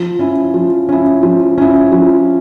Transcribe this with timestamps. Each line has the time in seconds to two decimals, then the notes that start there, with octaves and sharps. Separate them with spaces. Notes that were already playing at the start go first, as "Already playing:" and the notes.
Already playing: F3
0.19 C#4 E4
0.54 F3
0.89 C#4 E4
1.23 F3
1.58 C#4 E4
1.92 F3